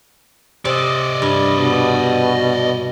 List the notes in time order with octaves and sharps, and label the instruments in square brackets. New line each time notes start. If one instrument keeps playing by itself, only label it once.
[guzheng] C3 [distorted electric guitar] D5 D#5
[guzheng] G2
[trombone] B2